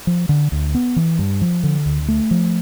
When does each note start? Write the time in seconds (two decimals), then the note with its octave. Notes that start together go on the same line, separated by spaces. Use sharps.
0.07 F3
0.29 D3
0.52 D2
0.74 B3
0.96 E3
1.19 G2
1.41 F3
1.63 D3
1.86 D2
2.08 A3
2.31 F3